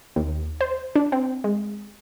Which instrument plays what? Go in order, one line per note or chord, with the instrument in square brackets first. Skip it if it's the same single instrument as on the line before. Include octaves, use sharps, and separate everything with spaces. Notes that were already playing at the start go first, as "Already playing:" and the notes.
[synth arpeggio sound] D#2
C5
D4
C4
G#3